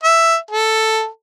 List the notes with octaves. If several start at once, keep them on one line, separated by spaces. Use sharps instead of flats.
E5
A4